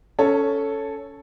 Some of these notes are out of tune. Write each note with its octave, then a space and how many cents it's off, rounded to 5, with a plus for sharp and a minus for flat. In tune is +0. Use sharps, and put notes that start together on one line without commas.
C#4 +15 A4 +0 C#5 +0